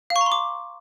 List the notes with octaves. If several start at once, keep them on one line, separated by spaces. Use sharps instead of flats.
F5
C#6
A#5
C6
D6